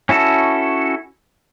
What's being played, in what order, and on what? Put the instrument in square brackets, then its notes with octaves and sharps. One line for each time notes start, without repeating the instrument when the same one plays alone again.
[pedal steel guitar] C#4 E4 F#4 A4